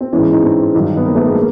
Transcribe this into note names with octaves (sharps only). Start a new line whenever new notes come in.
C4
G#2 E3 B3 C#4
D#4
C4 D4
G2 D#3 F#3
B3
A#3 C4
A3 B3
G#3 A#3
A#3